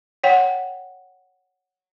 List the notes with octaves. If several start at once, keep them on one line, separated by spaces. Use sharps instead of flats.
C#5 F#5 G5